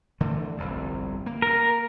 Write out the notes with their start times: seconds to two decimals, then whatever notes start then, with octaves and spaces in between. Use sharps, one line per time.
0.21 D3 E3 A3
0.58 G1 C2 F2
1.26 A#3
1.42 A#4